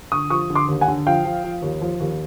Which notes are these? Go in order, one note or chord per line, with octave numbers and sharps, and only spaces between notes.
D3 C#6 D#6
F3 C#6 D#6
D3
C6 D6
D#2
F#5 G#5
D3
F3 F5 G5
F3
F3
D#2
F3
D#2